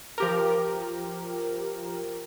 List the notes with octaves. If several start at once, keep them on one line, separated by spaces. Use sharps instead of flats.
F3 G4 A#4